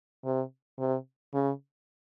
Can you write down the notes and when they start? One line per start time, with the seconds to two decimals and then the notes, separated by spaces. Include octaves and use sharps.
0.25 C3
0.79 C3
1.34 C#3